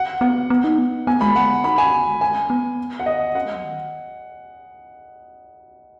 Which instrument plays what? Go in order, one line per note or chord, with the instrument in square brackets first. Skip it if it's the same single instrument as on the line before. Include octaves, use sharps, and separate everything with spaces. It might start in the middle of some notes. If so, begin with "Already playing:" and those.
Already playing: [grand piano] F#5
[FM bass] B3 [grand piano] F#5
[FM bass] B3
D#4
B3
[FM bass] B3 [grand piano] G#5
[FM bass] G#3 [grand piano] B5
[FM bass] B3 [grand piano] F#5
[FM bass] D#4 [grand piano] B5
[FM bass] C#4 [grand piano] G#5
[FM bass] B3
G#3
[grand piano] G#5
[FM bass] C#4
B3
[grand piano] F#5
D#5
[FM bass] C#4 [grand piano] F#5
[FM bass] G#3
F#3
D#3